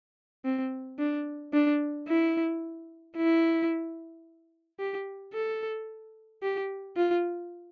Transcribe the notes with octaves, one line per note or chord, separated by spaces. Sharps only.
C4
D4
D4
E4
E4
G4
A4
G4
F4